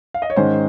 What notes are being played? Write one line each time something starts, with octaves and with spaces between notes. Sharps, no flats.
F5
D#5
C#5
G#2 D#3 G#3 C#4 C5